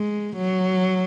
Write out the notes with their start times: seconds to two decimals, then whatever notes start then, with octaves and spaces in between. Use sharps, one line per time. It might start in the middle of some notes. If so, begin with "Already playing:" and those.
Already playing: G#3
0.36 F#3